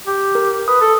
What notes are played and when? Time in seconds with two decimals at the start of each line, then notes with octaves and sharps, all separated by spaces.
0.07 G4
0.35 A#4
0.68 B4 D#6
0.81 A4